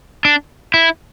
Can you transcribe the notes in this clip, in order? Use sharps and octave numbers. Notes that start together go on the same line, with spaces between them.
D4
E4